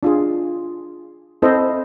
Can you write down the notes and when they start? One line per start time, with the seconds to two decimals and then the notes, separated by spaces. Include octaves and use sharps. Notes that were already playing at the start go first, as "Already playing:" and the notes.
0.03 D4 F4 G#4
1.42 C4 E4 A4 C5 D#5